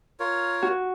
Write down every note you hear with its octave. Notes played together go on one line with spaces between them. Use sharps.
F4 A#4 C#5
F#4